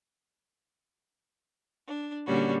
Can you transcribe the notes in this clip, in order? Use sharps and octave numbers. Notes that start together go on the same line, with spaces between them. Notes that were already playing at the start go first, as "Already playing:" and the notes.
D4
A#2 D3 G3 C#4 F#4